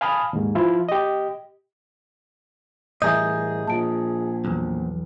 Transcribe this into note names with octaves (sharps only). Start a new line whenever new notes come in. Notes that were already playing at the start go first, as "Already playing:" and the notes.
F5 G#5 A5 B5 D#6 F6
D#2 G#2
F3 E4 F4
G4 D#5
A2 E3 G3 G#4 D#5 E5 A#5 G6
A#2 F3 A5 D7
B1 E2